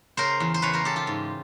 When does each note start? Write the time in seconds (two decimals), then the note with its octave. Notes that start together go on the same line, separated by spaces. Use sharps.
0.17 C#3 A#4 C5
0.40 E2
0.54 C5
0.62 C#3 B4 C#5
0.73 A#4 C5
0.85 E2 G4 A4
0.96 F4 G4
1.07 G#2